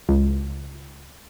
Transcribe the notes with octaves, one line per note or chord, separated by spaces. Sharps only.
C#2